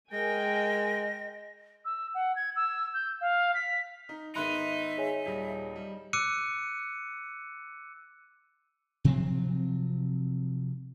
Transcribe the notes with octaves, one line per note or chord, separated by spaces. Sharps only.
G#3 A#4 D#5 G5 G#5 A#6
E6
F#5
G#6
E6
G6
F5
B6
D#4
G#2 D#3 B3 D#4 E5 B5 C6 F#6
G#4 C#5 G#5
D#1 G3
G3
D6 E6 F#6 C#7 D#7
C3 F3 F#3 C4